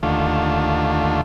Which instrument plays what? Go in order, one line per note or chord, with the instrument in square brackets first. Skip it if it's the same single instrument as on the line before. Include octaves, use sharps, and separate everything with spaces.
[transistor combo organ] D#2 D3 A3 F4